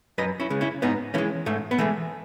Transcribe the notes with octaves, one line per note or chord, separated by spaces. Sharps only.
F#2 B4 D#5
C#4 E4
C#3 G#3
C#4 E4
G#2 B3 D#4
E3 G#3 A3 C#4
G#2 A3
B3
E3 G#3 A3